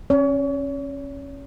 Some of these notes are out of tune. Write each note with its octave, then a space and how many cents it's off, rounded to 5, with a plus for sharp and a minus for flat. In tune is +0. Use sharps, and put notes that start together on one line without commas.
C#4 -25 C#5 +40